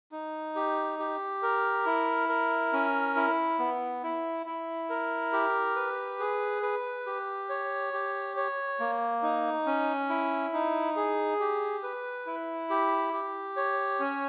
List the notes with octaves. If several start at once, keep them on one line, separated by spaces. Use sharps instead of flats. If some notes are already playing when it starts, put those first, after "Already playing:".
D#4
G4
G4
A#4
E4
A#4
C#4
E4
B3
E4
E4
A#4
G4
B4
G#4
B4
G4
C#5
G4
C#5
A#3
D#4
C#4
E4
D#4
G#4
G4
B4
E4
G4
G4
C#5
C#4